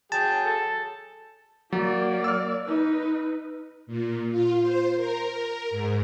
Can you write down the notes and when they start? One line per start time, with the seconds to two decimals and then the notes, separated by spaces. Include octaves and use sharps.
0.12 F#3 G#4 G5 A5
0.45 A4
1.72 F#3 A#3 D5
2.24 E6 F6
2.67 D#4 B4
3.87 A#2
4.31 F4
4.62 C5
4.96 A#4
5.33 A#4
5.70 G#2